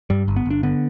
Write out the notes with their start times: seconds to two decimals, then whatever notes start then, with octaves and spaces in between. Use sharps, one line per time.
0.10 G2 G3
0.28 G1
0.36 B3
0.45 G1
0.50 D4
0.63 D3 B3